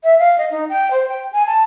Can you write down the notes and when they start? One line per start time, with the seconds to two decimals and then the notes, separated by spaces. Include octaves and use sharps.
0.03 E5
0.19 F5
0.38 D#5
0.51 D#4
0.69 G5
0.91 C5
1.09 G5
1.33 G#5
1.46 A5